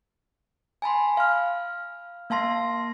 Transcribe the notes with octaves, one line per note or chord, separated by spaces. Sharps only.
G#5 A5 B5 C6
F5 F6
A#3 F5 A5 C6 A#6